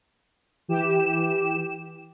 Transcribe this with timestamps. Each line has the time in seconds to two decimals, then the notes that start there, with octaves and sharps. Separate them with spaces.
0.68 E3 G4 E7